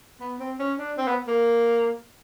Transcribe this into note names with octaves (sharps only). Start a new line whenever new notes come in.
B3
C4
C#4
D4
C4
B3
A#3